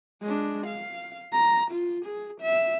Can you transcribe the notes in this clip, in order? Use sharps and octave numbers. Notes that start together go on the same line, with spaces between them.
G#3 D4
F5
A#5
F4
G#4
E5